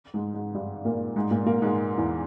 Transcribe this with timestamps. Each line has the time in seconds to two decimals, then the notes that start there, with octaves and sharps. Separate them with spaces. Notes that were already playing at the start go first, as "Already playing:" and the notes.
0.14 G#2 G#3
0.34 G#2 G#3
0.55 G2 G3
0.85 A#2 A#3
1.16 G#2 G#3
1.31 A#2 A#3
1.46 A#2 A#3
1.62 G#2 G#3
1.97 E2 E3